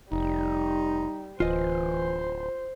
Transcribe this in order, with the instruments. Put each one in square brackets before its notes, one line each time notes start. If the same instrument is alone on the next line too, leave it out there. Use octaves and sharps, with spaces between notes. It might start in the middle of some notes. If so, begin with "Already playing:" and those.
[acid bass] F1 [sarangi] G3 [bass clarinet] D#4
[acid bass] D1 [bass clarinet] E3 [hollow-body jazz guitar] F4 D#5 [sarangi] C5